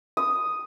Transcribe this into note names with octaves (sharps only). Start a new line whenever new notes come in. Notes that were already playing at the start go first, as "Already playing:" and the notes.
D#6